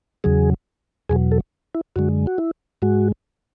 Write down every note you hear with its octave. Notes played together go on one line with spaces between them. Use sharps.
E2 C#3 F#3 G#4
E2 B2 F#3 G#4
A4
E4
F#2 D3 G#3 F#4
F#4
E4
G#2 G#3 F#4